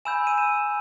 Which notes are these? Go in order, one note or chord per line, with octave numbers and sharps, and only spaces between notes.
G#5 B5 E6 G6 E7
D#7
E7